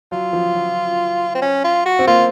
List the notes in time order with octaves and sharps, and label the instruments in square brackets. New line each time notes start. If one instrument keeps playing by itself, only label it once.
[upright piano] F#3 [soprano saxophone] F4
[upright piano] F3
F#3
[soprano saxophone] C4
C#4
F4
F#4
[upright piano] C4
[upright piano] A#3 [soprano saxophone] F4